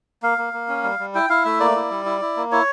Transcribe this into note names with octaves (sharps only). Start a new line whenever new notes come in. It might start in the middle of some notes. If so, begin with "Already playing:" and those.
A#3 F5
A#3
A#3
C#4
G3
G3
E4 G5
E4 F5
A3 E5
A#3 D5
E4
G3
E4
E4
A#3
E4 C#5